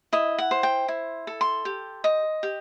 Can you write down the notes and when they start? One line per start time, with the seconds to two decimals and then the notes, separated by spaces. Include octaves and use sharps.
0.13 E4 D#5
0.38 F#5
0.51 C5
0.63 G5
0.88 E4
1.27 A4
1.41 C6
1.65 G4
2.04 D#5
2.43 G4